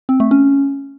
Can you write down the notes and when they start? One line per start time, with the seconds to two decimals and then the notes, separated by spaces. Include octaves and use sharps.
0.09 C4
0.20 A3
0.31 C#4